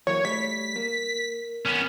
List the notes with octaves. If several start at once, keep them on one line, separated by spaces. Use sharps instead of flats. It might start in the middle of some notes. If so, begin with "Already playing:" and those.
E3 F#3 A#3 C#5
G3 A3 B6
A#3
B3 C#4